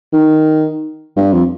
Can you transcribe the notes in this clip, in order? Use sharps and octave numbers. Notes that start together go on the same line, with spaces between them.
D#3
G2
F2